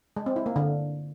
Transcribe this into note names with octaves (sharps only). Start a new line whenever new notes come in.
G#3
C4
E4
A#3
D3